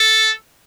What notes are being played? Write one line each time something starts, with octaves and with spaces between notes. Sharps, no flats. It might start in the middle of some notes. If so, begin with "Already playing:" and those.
Already playing: A4